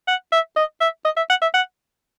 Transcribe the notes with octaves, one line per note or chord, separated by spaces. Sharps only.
F#5
E5
D#5
E5
D#5
E5
F#5
E5
F#5